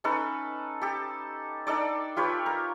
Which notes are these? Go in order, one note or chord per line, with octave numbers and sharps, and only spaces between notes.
C#4 D#4 A4 B4
G4 A4
D4 D#4 A4 D5
F4 G4 B4 C#5
A#4